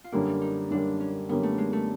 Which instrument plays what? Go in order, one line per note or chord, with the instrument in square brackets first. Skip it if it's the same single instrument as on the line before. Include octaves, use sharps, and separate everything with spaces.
[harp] F4
[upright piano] F#2 D3 G3 A#3 [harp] E4
[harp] D#4
[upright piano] F#2 D3 G3 A#3 [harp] D4
[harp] C#4
[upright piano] F#2 D3 G3 A#3 [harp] B3
[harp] A3
G#3
A3